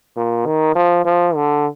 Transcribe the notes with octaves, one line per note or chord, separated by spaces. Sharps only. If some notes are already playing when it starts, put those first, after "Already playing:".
A#2
D#3
F3
F3
D3